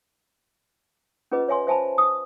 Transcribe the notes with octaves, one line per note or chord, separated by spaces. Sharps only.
C#4 F4 G#4 B4 D#5
C#5 E5 G#5 C6
C5 E5 G#5 A5 B5
D#6